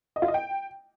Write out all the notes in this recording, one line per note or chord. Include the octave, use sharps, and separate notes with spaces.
D#5
F4
D#5
G5